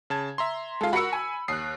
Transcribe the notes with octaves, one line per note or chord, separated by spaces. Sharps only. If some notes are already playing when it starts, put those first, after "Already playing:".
C#3 A5 G#6
E5 A#5 C6
G#3 F4 A4 F5
F#4 A#4 B5 E6 C#7
G#5
D#2 D#6 F#6 C7